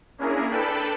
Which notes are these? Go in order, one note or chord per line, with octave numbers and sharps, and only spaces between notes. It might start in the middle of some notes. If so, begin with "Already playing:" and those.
A#3 C#4 D4 E4 G#4 A#4
D4 A4 B4 G5 A5 B5